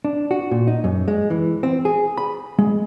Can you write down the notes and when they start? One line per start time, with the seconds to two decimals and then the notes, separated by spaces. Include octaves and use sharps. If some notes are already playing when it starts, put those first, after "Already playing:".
0.05 D4
0.31 F#4
0.51 A#2
0.67 D#4
0.84 F#2
1.08 G#3
1.30 E3
1.63 C4
1.85 G#4
2.18 B5
2.59 G#3